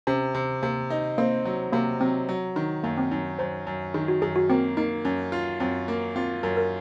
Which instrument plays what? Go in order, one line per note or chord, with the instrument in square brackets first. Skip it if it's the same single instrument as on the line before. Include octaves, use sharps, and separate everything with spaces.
[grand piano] C3 [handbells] C#4
[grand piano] C3
[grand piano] C3 [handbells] A#3
[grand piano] D#4
[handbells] A#3 [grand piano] C4
[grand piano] F#3
[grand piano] C3 [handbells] A#3
[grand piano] F#3 [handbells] C4
[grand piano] F#3
D#3
[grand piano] F#2 [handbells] A#3
[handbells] C4
[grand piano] F#2 [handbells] D#4
[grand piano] F#2 [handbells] C5
[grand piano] F#2
[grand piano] D#3 [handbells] G#4
[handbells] F#4
[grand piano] F#2 [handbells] G#4
[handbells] F#4
[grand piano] A#3 [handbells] C4
[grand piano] A#3 [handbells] D#4
[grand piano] F#2 [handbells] C#4
[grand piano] F4
[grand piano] F#2 [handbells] C4
[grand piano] A#3
[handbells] C4 [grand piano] F4
[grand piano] F#2 [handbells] A#4
[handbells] A#4